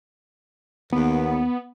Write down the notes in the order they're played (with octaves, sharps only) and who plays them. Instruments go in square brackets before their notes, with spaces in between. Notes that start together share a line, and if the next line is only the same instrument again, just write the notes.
[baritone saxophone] D#2 [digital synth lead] B3